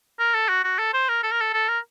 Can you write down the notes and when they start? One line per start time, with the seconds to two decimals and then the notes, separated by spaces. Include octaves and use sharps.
0.19 A#4
0.34 A4
0.49 F#4
0.64 F#4
0.79 A4
0.94 C5
1.09 A#4
1.24 A4
1.32 A#4
1.41 A4
1.53 A4
1.69 A#4